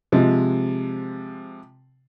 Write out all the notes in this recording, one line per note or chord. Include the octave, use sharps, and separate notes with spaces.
C3 F3 G#3